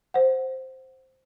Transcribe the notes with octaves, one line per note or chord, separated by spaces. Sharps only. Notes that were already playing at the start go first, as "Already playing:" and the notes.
C5 F#5